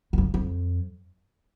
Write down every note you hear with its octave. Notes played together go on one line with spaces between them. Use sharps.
E2
F2
F2